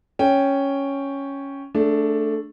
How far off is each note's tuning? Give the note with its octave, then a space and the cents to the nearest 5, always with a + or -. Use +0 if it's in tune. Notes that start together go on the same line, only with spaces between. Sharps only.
C#4 +0 G5 +0
A3 +5 D4 +0 G#4 +35